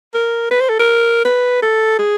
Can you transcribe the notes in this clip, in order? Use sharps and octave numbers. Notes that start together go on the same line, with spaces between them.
A#4
B4
C5
A4
A#4
B4
A4
G#4